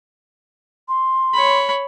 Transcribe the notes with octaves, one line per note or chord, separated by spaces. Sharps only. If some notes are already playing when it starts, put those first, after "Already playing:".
C6
C#5 B5